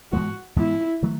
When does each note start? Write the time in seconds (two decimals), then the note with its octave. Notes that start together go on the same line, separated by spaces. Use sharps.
0.12 G#2 E3 G#3 B3 F#4
0.56 G#2 E3 G#3 B3 E4
1.02 D#3 F#3 A3